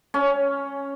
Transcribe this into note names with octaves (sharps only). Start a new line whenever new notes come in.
C#4